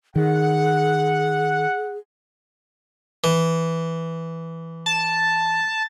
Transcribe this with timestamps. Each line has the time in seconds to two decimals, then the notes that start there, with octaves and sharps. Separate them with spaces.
0.16 D#3 G#4 F#5
3.24 E3
4.86 A5